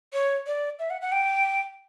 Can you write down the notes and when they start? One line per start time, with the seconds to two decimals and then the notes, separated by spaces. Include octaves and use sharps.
0.13 C#5
0.47 D5
0.79 E5
0.90 F#5
1.01 F#5
1.12 G5